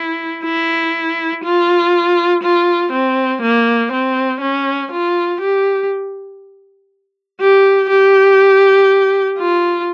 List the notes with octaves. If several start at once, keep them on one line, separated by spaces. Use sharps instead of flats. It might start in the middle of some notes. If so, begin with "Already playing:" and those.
Already playing: E4
E4
F4
F4
C4
A#3
C4
C#4
F4
G4
G4
G4
F4